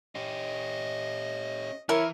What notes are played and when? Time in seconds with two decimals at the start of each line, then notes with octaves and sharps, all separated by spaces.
0.15 C#4 G4 D#5
1.89 E3 E4 A#4 C#5